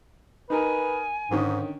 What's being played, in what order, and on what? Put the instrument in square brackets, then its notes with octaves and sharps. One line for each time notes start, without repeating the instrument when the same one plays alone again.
[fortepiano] D#4 A#4 [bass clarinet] B4 [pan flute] G#5
[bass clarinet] G#2 [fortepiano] D3 D#3 C#4